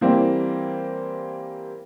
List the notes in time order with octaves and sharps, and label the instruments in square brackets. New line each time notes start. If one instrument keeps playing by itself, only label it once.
[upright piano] E3 G3 A#3 C4